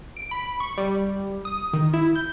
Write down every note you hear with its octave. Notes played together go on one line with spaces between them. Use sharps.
D7
B5
C#6
G3
D#6
D#3
E4
G6